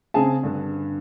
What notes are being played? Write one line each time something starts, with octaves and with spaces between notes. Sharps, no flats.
C#3 C4 G#4 G#5 A5
G2 D3